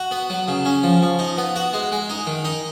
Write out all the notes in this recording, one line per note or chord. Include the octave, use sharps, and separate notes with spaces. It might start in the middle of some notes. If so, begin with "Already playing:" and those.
Already playing: F#4
B3
F#3
C#3
C#4
F3
F3
D#4
B3
F#4
G#3
G#3
D#4
D#3
D#4